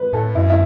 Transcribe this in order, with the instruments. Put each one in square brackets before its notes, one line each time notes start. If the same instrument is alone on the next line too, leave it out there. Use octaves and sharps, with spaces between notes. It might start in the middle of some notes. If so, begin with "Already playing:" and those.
Already playing: [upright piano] B4
[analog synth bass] A2 [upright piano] A4
[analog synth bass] F#2 [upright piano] E4
[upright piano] E4